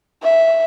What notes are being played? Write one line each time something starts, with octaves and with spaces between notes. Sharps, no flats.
E5